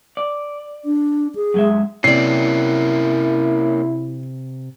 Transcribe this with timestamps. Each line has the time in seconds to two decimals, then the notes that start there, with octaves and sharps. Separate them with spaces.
0.17 D5
0.85 D4
1.35 G#4
1.54 F#2 G#3 E5
2.04 C3 A#3 C#4 E4 D5 C7